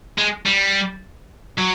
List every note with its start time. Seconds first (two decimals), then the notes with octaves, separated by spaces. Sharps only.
0.18 G#3
0.46 G3
1.58 F#3